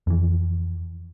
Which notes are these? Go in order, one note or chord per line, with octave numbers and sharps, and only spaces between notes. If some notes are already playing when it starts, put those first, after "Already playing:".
F2 E3